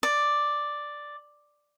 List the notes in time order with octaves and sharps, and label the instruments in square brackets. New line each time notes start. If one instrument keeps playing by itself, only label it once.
[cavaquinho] D5